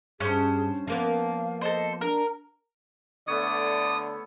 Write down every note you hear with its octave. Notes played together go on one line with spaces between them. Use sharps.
G2 C#4 G#4 C5
F3 A#3 B3 F5
A4 C5 D#5
D4 A#4
D3 A3 B3 C#5 D5 D#6